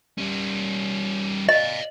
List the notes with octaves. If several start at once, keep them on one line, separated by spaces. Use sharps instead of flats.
G3 C#4
D5 D#5 F5